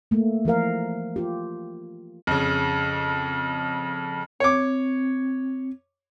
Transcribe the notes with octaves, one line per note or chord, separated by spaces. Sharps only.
A3 A#3
E3 F3 A#4 F5
F4 G4
F2 C#3
C4 C#5 D6